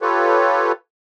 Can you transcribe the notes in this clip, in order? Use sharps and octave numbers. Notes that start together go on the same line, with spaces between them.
F4 G4 A4 B4 C#5